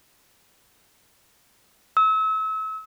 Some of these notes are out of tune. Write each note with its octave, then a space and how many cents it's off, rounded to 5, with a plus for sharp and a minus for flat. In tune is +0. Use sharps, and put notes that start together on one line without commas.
E6 -35